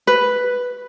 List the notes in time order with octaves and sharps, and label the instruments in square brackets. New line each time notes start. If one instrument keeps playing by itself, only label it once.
[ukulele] B4